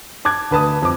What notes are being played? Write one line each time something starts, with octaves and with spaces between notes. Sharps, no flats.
A5 D6 F#6 G#6
D2 B4 A5 D#6
F2 D6